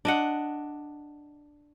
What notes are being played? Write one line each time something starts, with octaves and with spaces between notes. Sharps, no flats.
D4 D#5 F#5